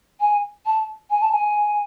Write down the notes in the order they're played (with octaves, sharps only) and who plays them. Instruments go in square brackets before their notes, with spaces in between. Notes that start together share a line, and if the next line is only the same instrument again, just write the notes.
[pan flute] G#5
A5
G#5
A5
G#5